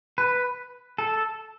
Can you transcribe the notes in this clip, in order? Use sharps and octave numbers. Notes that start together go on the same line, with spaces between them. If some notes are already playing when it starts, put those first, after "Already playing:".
B4
A4